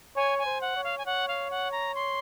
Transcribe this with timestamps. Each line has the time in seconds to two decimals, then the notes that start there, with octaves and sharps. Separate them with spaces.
0.16 C#5 G#5
0.39 G#5
0.46 C5
0.61 F#5
0.76 C#5
0.84 F5
0.98 G#5
1.06 C#5 F#5
1.28 F5
1.51 F#5
1.72 A#5
1.95 C6